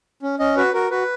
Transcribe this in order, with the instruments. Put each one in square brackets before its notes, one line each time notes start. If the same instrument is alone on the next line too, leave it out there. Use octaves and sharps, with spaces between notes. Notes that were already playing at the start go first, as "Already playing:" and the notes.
[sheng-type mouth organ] C#4
C#4 D#5
F#4 B4
F#4 A#4
F#4 B4